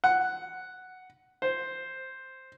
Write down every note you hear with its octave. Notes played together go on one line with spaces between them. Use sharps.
F#5
C5